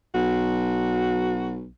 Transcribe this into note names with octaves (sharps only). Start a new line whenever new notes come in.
B1 F#4